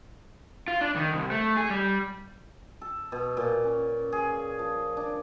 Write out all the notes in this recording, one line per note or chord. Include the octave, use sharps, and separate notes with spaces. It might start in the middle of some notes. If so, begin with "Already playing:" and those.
F4
D4
D#3
C2
A3
G#4
G3
A4
B2
A#2
C#4
G#4
F3
D4